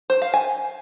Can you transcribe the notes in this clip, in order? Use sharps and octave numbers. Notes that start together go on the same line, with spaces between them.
C5
F5
G#5